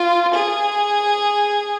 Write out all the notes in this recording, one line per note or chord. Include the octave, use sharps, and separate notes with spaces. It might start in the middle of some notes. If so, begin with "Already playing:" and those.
Already playing: F4
G#4